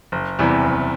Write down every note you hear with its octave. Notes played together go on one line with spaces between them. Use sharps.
F#1
E2 C3 E3 G3
F#1